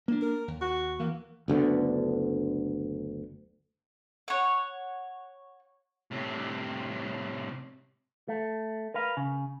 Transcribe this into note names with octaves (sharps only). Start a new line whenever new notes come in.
A#3 D4
A#4
D#2
F#4
E3 A#3
F#1 D2 D3 B3
C#5 F#5
A2 C3
A3
A#4 B4 F5
C#3